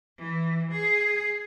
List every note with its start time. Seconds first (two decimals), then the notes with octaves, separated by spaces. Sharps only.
0.17 E3
0.71 G#4